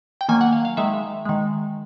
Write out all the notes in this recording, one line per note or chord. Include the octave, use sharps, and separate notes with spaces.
G5
D#3 F#3 A#3 G#5
F#5
F5
F5
D#3 G#3 E5
D#3 G#3